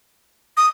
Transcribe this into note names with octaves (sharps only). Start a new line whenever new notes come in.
D#6